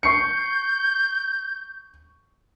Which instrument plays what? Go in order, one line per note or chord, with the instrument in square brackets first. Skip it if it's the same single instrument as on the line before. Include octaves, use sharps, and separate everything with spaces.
[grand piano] C#6 C7 C#7 [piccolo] G6